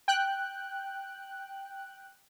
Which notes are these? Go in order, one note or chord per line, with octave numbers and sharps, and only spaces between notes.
G5 F#6